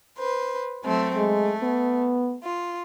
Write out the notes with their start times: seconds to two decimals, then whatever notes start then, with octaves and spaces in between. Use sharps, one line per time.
0.18 B4 C5
0.84 F#3 A3 C4
1.17 G#3 A3
1.63 B3
2.43 F4